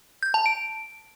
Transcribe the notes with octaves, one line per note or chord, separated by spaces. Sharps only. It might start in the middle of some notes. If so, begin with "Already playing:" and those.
G6
A5
D7